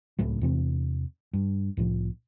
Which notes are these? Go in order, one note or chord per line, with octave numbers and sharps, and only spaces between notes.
D1 C#2 A2 F#3
E2 C3 C4
G2
C2 A2 F3